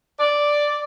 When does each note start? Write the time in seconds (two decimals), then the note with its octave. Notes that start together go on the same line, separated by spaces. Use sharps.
0.19 D5